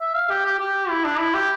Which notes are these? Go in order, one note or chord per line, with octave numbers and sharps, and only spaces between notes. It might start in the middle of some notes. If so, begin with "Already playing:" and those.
E5
F5
G4
G4
G4
E4
D4
E4
G4